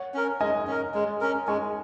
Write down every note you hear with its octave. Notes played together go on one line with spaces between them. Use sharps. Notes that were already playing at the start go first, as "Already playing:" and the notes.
Already playing: C#5 F#5
C#4 A#4
G#3 D#5 G#5
C#4 A#4
G#3
C#4 A#4
G#3 G#5 C#6